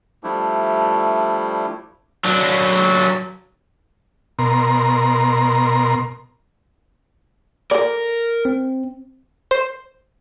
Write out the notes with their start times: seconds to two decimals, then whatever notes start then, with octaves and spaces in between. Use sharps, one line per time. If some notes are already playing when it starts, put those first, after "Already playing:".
0.23 F3 G3 A3 D4 E4
2.24 F#3 D4
4.39 B2 A#4 C6
7.71 A4 A#4 C5 D5
8.45 C4
9.51 C5